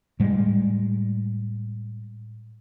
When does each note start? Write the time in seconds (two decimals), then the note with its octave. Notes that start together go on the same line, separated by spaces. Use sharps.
0.20 A2 G3 G#3